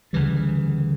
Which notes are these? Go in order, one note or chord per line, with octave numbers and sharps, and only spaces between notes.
D2 C#3 E3 G3